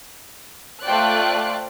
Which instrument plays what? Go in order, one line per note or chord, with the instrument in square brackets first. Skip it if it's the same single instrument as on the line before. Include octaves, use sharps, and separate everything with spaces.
[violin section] A3 F4 C5 D5 G5 F#6